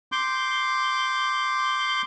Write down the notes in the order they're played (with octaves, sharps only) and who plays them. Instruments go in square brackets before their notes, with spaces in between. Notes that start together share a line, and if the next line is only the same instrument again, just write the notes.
[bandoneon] C6 D6 G6